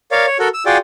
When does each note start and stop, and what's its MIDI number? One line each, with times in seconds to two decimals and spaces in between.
0.11 0.26 70
0.11 0.26 73
0.11 0.26 74
0.11 0.26 77
0.27 0.37 73
0.39 0.48 66
0.39 0.48 69
0.39 0.48 70
0.54 0.64 88
0.66 0.78 65
0.66 0.78 66
0.66 0.78 68
0.66 0.78 74
0.66 0.78 79